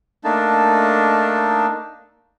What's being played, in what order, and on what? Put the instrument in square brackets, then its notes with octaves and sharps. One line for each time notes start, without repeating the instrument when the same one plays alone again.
[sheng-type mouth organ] A3 A#3 D4 D#4 A5